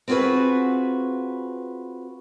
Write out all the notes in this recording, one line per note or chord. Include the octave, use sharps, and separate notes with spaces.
C4 F4 F#4 G#4 B4